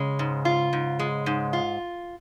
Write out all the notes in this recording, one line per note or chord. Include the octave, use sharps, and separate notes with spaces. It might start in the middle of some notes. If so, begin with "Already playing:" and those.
Already playing: C#3 G#3
G#2
F4
G#2
G#3
G#2
F4